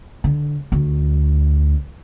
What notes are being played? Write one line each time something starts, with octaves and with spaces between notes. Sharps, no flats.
D3
D2